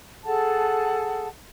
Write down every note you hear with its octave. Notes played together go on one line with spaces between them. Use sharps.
G#4 A4 F#5 A5